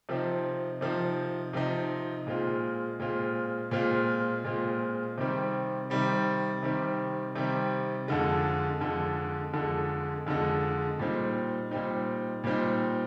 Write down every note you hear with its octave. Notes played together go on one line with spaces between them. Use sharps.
C3 F3 C4 D#4
C3 F3 C4 D#4
C3 F3 C4 D#4
A#2 G#3 C4 F4
A#2 G#3 C4 F4
A#2 G#3 C4 F4
A#2 G#3 C4 F4
C3 D#3 G3 C4
C3 D#3 G3 C4
C3 D#3 G3 C4
C3 D#3 G3 C4
F2 D3 G#3
F2 D3 G#3
F2 D3 G#3
F2 D3 G#3
A#2 G3 C4 D#4
A#2 G3 C4 D#4
A#2 G3 C4 D#4